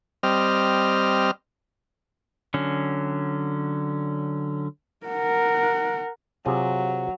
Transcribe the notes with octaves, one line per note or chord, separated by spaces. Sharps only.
G3 C4 D#5 F6
D3 F#3 C#4
A#4 F#5
C3 F#3 F4 G#4